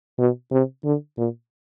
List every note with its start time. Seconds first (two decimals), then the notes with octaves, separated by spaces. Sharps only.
0.18 B2
0.51 C3
0.85 D3
1.18 A#2